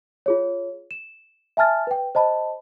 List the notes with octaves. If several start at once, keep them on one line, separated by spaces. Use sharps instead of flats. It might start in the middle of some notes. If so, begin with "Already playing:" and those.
F4 G#4 C#5
E7
E5 G#5 A5 F6 A6
B4 G5
C5 D#5 A5 B5